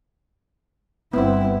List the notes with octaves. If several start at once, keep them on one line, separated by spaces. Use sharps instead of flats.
G1 B3 C4 E4